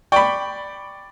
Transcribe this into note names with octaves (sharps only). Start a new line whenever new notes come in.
D5 G5 B5 C#6